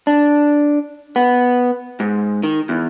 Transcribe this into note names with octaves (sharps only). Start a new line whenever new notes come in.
D4
B3
G#2
D#3
E2